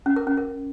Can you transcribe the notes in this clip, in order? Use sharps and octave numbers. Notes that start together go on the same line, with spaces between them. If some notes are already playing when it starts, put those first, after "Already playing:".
C#4
A#4
C#4
A#4